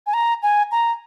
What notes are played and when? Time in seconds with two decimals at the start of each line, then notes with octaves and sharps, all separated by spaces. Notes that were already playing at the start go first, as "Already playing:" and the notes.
0.07 G#5
0.14 A#5
0.43 G#5
0.72 A#5